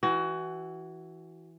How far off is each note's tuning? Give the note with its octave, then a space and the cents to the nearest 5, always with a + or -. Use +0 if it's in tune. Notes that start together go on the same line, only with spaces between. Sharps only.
E3 +0 F#4 +25